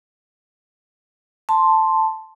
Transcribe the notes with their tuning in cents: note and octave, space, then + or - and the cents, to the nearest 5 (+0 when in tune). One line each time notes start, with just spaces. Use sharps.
A5 +0 C6 +0